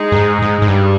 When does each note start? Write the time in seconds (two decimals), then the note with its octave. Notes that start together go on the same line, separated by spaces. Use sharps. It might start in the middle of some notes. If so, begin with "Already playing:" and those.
Already playing: G#3 D#4 G#4
0.12 G2
0.16 G#2
0.42 G#2
0.62 G#2
0.68 G2 G3